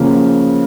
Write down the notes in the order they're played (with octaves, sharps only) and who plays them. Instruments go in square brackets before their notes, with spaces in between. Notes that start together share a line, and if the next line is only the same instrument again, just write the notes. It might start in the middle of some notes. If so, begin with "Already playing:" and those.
Already playing: [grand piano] C#3 F3 A#3